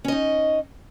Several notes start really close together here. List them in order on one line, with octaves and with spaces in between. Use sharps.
C#4 D#5 D#4